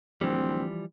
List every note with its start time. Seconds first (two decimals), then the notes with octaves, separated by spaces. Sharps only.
0.21 D1 E3 F3 G3 C4